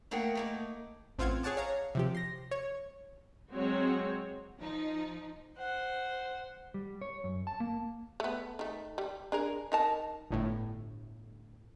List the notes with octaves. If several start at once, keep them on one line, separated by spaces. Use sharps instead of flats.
A3 A#3 G#4 A#4 F#5 G5
A3 A#3 D#4
A1 C4 F4 F5 F#5 G#6
G#4 C#5 F#5 A5 D6
C#5 F5 A#5
C3 F3 G4
C6 A#6
C#5
F#3 G#3 C4 F#4 C#5
F3 D#4
C5 F#5
G3
C#5
F#2
A5
A#3
A3 B3
D#3 A3
G3
D4 G#4 A#4
D#4 A#4 A5
G1 A2